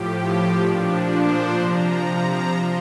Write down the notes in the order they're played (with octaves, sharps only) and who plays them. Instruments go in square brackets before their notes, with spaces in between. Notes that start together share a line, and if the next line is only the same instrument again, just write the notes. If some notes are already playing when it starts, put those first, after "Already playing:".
Already playing: [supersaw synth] A2 F3 G4
A#2 F3 D4
C5
C3 F3 A#5
A#5
F3 C6